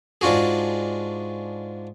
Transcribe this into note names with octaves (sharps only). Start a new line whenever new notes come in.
G#2 D4 F4 F#4 G#4